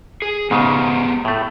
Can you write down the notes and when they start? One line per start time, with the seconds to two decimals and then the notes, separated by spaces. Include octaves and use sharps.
0.22 G#4
0.51 G#2 C#3 B3 G4 G#4
1.25 A2 A3